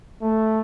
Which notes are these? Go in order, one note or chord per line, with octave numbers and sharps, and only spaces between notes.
A3